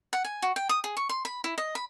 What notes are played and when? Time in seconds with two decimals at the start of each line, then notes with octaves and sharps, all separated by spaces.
0.13 F#5
0.24 G#5
0.42 F#4
0.56 G5
0.69 D#6
0.84 G#4
0.97 C#6
1.09 C6
1.25 B5
1.44 E4
1.58 D#5
1.75 B5